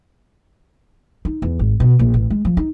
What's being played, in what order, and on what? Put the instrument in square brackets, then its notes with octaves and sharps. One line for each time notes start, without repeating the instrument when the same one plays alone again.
[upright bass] D#4
E2
G#1
B2
A#1
A1
G#3
F3
D#4